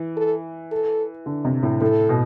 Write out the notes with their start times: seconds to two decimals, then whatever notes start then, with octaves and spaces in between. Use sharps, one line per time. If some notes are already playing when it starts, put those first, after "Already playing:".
Already playing: E3
0.17 A4
0.72 A4
1.26 D3
1.45 C3
1.63 A2
1.81 A2 A4
2.09 B2